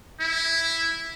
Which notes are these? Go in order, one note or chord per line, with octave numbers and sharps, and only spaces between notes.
E4